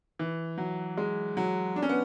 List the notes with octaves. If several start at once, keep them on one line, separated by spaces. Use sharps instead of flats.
E3
F#3
G#3
F#3
D4
C#4
B3